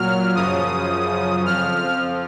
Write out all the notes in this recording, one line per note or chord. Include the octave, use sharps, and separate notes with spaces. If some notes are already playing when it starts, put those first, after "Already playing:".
Already playing: A#2 F#3 F6
F#2 C#3 F3 D#6
F2 F3 F6